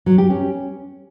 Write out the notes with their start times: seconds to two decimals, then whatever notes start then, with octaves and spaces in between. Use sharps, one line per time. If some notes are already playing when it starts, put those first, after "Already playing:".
0.06 F#3
0.18 G4
0.30 C#4